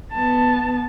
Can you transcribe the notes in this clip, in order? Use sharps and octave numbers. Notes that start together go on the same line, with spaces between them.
B3 A5